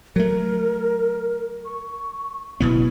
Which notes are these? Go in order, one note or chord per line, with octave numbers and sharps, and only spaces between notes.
F#3 A3 A#4
C#6
F#1 B2 B3 E4